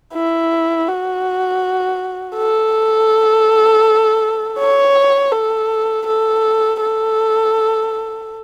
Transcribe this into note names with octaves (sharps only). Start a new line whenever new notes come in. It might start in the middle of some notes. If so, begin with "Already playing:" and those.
E4
F#4
A4
C#5
A4
A4
A4